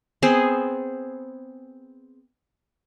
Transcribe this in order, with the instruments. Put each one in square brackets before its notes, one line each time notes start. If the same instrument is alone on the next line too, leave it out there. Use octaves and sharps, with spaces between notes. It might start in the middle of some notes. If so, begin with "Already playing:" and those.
[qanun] B3 C4 G#4 C5